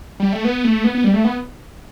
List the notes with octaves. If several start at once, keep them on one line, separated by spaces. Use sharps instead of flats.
G3
A3
B3
A3
B3
B3
G3
A3
B3